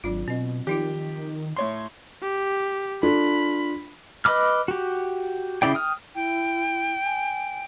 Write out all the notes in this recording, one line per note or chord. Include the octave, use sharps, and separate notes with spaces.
G#1 F#3 D4 F4
B2 C4 D#5
D#3 F3 D#4 F4 G4
A2 C#5 C6
G4
D4 F4 A4 B5
B4 D#5 B5 D6 F6
F#4 G4
C#3 A#3 E4 D5 G5
G5 D#6 F6
E4 G5
G#5